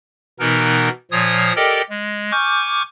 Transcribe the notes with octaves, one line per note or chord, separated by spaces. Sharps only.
B2 E3 B3 D#4 A#4
A#2 F3 C#5 D#6
G4 A4 A#4 D5 D#5 G5
G#3
G#5 C#6 D6 F6 G6